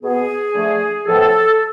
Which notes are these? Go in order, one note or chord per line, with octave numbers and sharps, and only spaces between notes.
B2 B3 G#4
D3 F3 A3
A2 F3 B3 A4